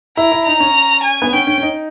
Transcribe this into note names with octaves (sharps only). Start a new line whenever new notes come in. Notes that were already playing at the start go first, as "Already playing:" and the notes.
E4 A#5
E4
D#4 A#5
C#4
G#5
B3
C#4 G5
C#4
C#4
D#4